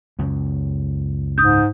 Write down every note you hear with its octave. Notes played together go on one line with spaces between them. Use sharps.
C#2 F#2
G#2 D#6 G6